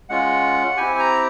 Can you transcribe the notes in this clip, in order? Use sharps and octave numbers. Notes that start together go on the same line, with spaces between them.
G#3 C#4 F4 F#5
C4 E4 G4 G#5
A#5